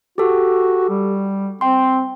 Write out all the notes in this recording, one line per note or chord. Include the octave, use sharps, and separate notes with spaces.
F#4 G4 A4
G3
C4 G5 C6